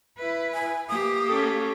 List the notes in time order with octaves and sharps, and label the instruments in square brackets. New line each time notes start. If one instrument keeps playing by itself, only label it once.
[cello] E4 B4
[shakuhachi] G#5
[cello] A#3 G4 [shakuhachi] D#6
[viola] C#4 A4